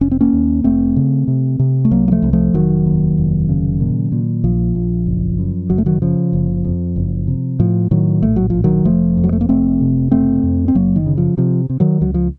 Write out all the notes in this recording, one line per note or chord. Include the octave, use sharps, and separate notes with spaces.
F1 C#4
C4
A#3 C#4
D#2
F1 A3 C4
C#3
C3
C3
A3
C2 F#3 A#3
A#3
F3 A3
C2
F3 A3
F1 D#3 F#3
D#2
F1
C#3
A#2
A#2
A#1 F3
A#1
F#1
F#2
F#1 F#3
A3
D#3 F#3
C#3 F3
F#1
F2
F#1
C3
A2 F3
A2 D#3 F#3
A#1 A3
F#3
A#1 F3
D#3 F#3
F1 F3 A3
F2
F#3
A3
A#3
F1 A3 C4
C3
F#1 A3 C4
F2
C4
F#1 F#3 A#3
D#3
C#3
F3
C3 F3
C3
D#3 F#3
C#2 F#3
F3